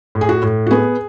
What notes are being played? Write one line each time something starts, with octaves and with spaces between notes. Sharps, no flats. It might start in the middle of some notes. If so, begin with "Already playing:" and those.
A2
G#4
F#4
A2
F#4
B3 G#4